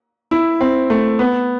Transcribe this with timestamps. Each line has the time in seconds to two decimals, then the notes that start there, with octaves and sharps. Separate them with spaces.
0.31 E4
0.61 C4
0.90 A3
1.19 B3